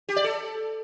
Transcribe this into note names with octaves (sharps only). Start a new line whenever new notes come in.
G4
D5
A4